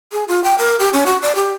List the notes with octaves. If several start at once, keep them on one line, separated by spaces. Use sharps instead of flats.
G#4
F4
G5
A#4
G4
C#4
F#4
D5
G4